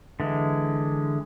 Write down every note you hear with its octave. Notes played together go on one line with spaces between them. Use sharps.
D3 E3 G#3